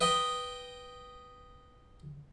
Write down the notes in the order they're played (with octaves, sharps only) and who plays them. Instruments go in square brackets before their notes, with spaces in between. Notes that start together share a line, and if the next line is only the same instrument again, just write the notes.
[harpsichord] B4 D#5 G5